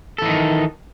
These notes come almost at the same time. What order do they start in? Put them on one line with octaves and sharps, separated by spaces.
A4 E3 D#4 D#3